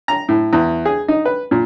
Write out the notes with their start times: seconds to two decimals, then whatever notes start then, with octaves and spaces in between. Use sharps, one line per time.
0.08 A#5
0.29 A2
0.53 E2
0.86 G#4
1.08 D#4
1.25 B4
1.51 A#2